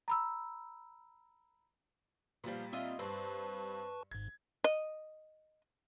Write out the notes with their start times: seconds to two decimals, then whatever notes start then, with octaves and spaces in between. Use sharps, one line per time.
0.08 A#5 B5 E6
2.44 A#2 F3 G3 B3
2.73 C4 F4 D#5 E5
2.99 G2 C4 B4 A5 C#6
4.11 G#1 G#2 G#6
4.64 D#5